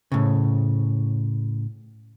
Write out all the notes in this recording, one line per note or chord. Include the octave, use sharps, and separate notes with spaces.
A2 C#3